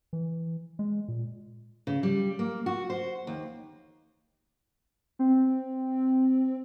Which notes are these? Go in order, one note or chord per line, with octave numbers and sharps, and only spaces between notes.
E3
G#3
A#2
C#3
G3
A#3
F#4
C5
D#2
C4